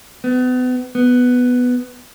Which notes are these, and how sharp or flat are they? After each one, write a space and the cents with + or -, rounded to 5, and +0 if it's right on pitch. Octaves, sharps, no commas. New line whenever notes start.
B3 +35
B3 +5